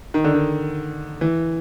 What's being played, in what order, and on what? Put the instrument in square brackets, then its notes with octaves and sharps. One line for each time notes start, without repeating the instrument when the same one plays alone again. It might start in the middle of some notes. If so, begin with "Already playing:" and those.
[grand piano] D#3
D3
D#3
E3